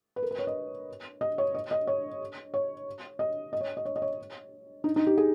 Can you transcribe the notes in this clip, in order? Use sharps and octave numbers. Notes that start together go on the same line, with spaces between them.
B4
A#4
B4
C#5
D#5
D#5
C#5
D#5
D#5
C#5
C#5
D#5
D#5
C#5
D#5
C#5
D#5
C#5
D#4
D#4
G4
G#4